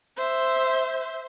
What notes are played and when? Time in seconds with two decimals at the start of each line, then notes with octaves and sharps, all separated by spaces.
0.17 C5 E5